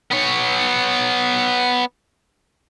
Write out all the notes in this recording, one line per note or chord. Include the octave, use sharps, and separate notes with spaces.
B3 C#5